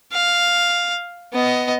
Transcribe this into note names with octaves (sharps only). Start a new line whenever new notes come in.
F5
B3 D#5